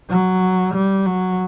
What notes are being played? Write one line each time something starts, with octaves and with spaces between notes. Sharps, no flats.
F#3
G3
F#3